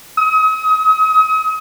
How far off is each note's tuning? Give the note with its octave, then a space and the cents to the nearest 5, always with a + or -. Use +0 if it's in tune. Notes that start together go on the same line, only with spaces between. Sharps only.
D#6 +35